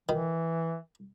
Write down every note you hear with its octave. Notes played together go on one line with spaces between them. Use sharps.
D#3 E3